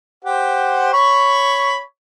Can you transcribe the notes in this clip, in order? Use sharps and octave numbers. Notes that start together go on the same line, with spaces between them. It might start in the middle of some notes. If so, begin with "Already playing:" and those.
G4 C5 F#5
C#5 B5 C#6